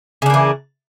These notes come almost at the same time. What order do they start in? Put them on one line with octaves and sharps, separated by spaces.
C#3 D4 A#3 E3